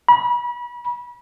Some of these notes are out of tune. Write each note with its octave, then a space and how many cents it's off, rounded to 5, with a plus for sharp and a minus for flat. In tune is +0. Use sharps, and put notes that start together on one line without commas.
B5 -35